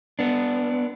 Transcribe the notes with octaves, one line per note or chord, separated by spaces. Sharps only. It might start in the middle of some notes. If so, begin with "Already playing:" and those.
B3 D4